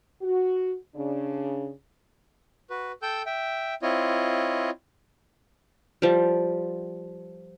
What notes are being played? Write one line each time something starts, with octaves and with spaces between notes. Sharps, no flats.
F#4
C#3 D4
F#4 B4
A4 G5 E6 G6
E5 G5
C4 E4 F4 C#5 D#5
F3 G3